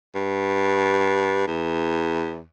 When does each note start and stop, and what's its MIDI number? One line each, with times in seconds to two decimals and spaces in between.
0.15 1.44 43
1.47 2.45 40